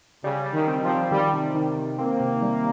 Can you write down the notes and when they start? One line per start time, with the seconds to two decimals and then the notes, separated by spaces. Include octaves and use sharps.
0.24 C#3 G3
0.46 G3
0.53 D#3
0.68 C4
0.83 F3
0.89 C4
1.11 D#3 G3
1.33 C3
1.55 D#3
1.76 D#3
1.98 A#3 C4
2.20 C3
2.42 G3